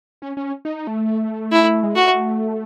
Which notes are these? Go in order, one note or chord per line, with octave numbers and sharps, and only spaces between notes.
C#4
C#4
D#4
A3
E4
G#3
A3 F#4